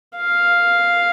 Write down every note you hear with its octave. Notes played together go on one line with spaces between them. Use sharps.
F5